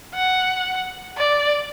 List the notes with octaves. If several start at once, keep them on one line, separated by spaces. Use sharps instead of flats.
F#5
D5